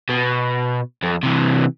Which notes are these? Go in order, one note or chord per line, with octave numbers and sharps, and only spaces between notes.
B2
F2
C3 E3